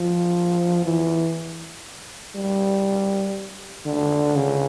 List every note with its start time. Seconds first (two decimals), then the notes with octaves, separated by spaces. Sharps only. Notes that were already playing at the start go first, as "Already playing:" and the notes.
Already playing: F3
0.85 E3
2.35 G3
3.86 D3
4.35 C#3